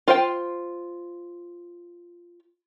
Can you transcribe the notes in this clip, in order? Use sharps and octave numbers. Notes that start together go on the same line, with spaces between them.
F4 C5 G5